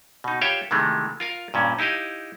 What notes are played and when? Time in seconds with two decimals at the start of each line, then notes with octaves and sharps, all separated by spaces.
0.24 B2 D#4
0.41 F4 G4 C#5 E5 F5 G5
0.71 C3 D#3 E3 G#3 A3
1.20 F4 A#4 F5
1.54 G2 A#2 C#4
1.79 D#4 E4 G4 D#5 F5